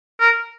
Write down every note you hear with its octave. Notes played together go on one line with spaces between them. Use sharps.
A#4